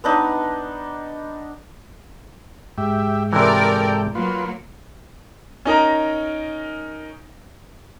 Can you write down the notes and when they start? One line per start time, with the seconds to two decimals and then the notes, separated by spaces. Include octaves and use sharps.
0.04 B3 D4 D#4
2.78 G#2 G#3 G4 E5
3.33 C3 E3 A4 A#4 D5 G5
4.15 F#3 A#3 F4 B4
5.65 C#4 D#4 A#4 A#5